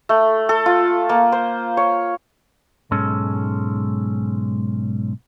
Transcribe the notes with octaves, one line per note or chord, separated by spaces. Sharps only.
A3
A4
F4
A#3
C5
C#5
B1 G#2 G#3 C#4 A4